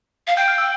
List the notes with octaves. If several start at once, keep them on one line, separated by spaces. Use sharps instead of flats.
F5
G5 G6
F6
E6